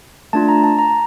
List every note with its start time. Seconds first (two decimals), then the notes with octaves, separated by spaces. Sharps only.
0.33 A3 D4 F4 A5
0.49 A#5
0.64 A5
0.79 A#5